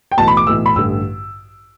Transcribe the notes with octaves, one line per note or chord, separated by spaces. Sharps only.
G5
B1 A2 E3 A5
B5
D6
B1 A2 E3 E6
B5
A1 G2 D3 E6